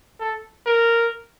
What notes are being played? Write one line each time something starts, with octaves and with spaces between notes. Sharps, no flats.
A4
A#4